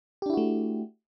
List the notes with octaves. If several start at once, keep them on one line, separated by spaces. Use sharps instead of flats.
A3 D4 E4 F#4 G4